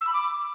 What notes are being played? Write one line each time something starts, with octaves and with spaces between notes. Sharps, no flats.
E6
B5
D6